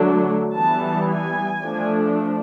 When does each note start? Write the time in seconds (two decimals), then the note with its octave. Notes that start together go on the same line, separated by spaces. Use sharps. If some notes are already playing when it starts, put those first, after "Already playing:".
Already playing: D3 F#3 A3 D4
0.55 E3 G3 B3 A5
1.08 G#5
1.62 F3 A3 D4